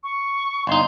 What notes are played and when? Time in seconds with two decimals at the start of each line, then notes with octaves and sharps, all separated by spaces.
0.03 C#6
0.67 G1 D#4 C6